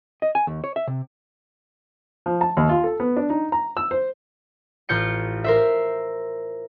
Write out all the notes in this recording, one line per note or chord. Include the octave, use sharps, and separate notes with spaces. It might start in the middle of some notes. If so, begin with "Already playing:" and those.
D#5
G#5
D#2
C#5
E5
C3
F3
A5
D#2
F4
A4
B3
D4
D#4
A#5
E6
C5
A1 F4 G6 C#7
A#4 C5 E5